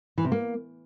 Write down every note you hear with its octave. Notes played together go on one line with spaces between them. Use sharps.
E3
C3
A#3